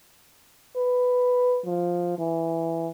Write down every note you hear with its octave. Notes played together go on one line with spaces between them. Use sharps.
B4
F3
E3